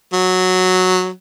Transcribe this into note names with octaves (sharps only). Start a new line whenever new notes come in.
F#3